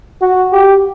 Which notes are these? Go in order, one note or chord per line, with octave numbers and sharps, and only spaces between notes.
F#4
G4